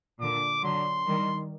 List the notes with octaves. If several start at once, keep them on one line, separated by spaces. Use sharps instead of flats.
A#2 D3 D6
D3 F#3 C6
D#3 G3